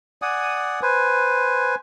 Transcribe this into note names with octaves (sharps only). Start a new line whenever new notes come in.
D5 F#5 G#5 D#6
B4 C5 G#5